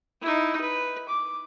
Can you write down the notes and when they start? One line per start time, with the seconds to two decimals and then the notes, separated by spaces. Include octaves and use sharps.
0.21 D#4 E4
0.61 B4
1.09 D6